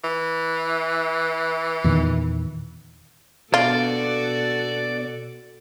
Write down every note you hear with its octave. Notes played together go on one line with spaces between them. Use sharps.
E3
E2 A#2 D#3
B2 B3 D4 F4 F#4 A4 D5